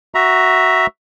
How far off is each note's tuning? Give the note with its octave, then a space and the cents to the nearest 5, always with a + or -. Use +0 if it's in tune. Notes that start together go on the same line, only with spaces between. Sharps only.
F#4 +0 E5 +0 A#5 +15